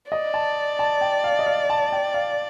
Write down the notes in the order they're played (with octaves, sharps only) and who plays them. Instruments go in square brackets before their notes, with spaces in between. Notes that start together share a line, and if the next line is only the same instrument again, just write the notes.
[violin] D5 [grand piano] D#5
[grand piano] A5
A5
G5
F5
D#5
F5
A5
G5
F5